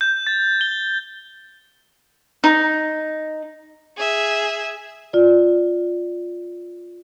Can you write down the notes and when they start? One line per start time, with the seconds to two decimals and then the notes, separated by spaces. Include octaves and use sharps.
0.01 G6
0.27 A6
0.61 G7
2.44 D#4
3.97 G#4 E5
5.13 F4 D5